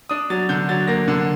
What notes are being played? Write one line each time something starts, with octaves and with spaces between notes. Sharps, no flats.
D4 D#6
F#3 A6
D3 G6
F#3 A6
A#3 A#6
D3